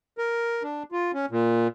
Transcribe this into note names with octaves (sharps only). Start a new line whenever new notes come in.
A#4
D4
F4
C#4
A#2